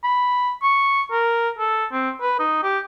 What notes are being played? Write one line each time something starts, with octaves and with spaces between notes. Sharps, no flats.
B5
C#6
A#4
A4
C4
B4
D#4
G4